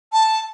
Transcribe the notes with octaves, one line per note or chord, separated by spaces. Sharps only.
A5